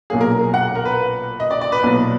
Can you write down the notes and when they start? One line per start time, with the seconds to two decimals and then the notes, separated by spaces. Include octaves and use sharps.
0.10 B1 A#2 F#3 A#3 G#4
0.21 A#4
0.54 F#5
0.75 A#4
0.85 B4
1.40 D#5
1.51 D5
1.61 D5
1.72 B4
1.83 B1 A#2 F#3 B3